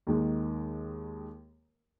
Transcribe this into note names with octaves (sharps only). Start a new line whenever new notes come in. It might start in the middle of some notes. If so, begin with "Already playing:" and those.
D#2 D#3 G#3